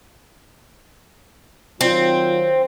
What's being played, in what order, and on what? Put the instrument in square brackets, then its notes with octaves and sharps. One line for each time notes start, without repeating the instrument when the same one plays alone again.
[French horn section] D#3 F#3 F4 [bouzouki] C4